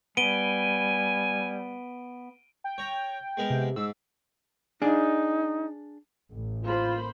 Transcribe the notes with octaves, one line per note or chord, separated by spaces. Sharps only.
G3 B3 G#5 D7 D#7 G7
G5
C#5 A#5
G#3 B3 A#4
C3
G#2 E6
D4 D#4 G#4
A1
A#3 F4 C5 B5